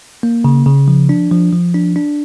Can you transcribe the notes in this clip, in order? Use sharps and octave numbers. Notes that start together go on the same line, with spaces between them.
A#3
C#3
C#3
F3
D4
F3
F3
D4
D4